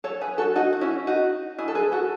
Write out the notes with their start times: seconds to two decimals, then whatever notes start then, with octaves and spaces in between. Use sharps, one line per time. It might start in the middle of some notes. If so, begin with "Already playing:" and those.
0.04 A4 C#5
0.21 G#4 B4
0.38 F#4 A4
0.55 D#4 F#4
0.73 F#4
0.81 C#4 E4
1.07 D#4 F#4
1.58 E4 G#4
1.68 A4
1.75 G#4 B4
1.92 F#4 A4